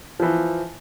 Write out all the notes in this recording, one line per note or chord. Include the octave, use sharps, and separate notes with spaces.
E3 F3